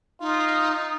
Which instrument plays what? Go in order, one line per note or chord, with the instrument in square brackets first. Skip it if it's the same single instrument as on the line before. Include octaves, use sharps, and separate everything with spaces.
[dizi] D#4 [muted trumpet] F4